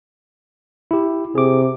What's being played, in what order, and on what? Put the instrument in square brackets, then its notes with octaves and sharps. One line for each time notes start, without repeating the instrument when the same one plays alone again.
[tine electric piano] E4 G4
[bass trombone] C3 [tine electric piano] G#4 D6